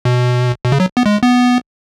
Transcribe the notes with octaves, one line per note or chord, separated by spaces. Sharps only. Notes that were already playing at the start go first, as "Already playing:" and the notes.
B2
B2
C#3
F#3
B3
G#3
B3